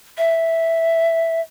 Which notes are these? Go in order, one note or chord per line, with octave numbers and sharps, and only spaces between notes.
E5